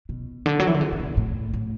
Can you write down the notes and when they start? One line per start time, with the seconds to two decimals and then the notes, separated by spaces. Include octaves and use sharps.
0.09 B2
0.46 D3
0.60 F#3
0.67 E3
0.74 D3
0.81 C#3
0.92 C#3
1.00 B2
1.17 A2
1.54 A2